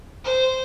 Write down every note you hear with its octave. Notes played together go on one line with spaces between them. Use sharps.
C5